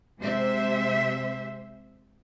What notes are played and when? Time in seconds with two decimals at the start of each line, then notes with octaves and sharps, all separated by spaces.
0.20 C3 G#3 C5 E5